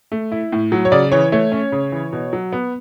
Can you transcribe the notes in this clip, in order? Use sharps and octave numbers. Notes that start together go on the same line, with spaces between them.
A3
E4
A2
F#3
C#5
C#3 D5
E3 C#5
A3 C#5
C#4
C#3
E3
B2
F#3
B3